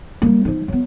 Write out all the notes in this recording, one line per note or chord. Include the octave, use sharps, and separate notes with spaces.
G3 A#3
F3 D#4
F#3 B3